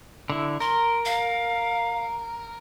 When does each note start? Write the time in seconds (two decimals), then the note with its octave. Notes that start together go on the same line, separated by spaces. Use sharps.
0.30 D3 E4
0.60 A#4 C6
1.05 F5